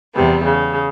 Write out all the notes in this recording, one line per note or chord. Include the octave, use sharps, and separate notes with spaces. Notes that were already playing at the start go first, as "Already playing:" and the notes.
E2 C3 G3 B3
C#3